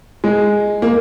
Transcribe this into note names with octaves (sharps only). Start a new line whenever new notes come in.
G#3
A#3